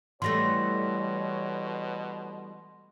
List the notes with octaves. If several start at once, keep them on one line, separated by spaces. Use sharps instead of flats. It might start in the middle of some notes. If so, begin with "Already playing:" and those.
B2 E3 G3 A3 C#5 C6 A#6